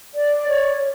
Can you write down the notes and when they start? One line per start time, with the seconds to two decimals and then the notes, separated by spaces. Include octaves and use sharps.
0.15 D5
0.49 C#5